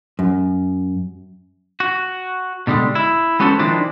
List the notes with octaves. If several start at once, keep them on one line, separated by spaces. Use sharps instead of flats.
F#2
F#4
B2 D3 G3 G#3
E4
G#3 B3 C#4 F#4 A4 C5
D#3 F3 G#3 C4 D4 E4